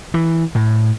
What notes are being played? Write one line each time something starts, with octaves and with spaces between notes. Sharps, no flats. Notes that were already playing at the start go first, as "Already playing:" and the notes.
E3
A2